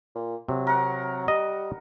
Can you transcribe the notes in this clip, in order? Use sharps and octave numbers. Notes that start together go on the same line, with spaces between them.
A#2
C3 F#3
A#4 F#5
G3 D#5